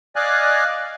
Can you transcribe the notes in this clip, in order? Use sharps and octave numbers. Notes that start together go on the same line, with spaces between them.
D5 D#5 F5 G#5 F#6